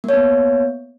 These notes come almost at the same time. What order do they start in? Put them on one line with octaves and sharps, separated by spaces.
A#3 C#5 B3